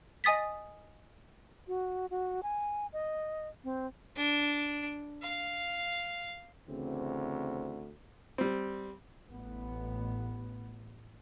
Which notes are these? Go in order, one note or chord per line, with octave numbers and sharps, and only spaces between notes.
D#5 G#5 D#6 A6 B6
F#4
F#4
G#5
D#5
C4
D4
F5
D2 C#3 E3 C4
G3 C4
A1 B3